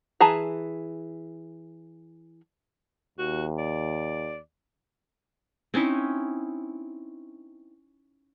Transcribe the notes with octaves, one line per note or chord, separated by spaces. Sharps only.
E3 G#4 A5 A#5
D#2 F#4
D5
C4 C#4 D#4 E4